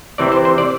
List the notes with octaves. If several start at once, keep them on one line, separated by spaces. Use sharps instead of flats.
C3 E3 C4 D5
C5
C5
D5